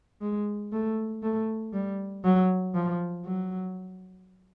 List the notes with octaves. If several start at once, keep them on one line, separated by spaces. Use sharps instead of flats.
G#3
A3
A3
G3
F#3
F3
F#3